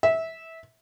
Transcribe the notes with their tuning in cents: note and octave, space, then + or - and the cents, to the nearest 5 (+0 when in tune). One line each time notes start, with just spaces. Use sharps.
E5 -20